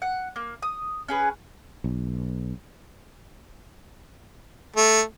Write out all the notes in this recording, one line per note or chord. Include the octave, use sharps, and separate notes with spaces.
F#5
A#3
D#6
C#4 G#4 B4
B1
A3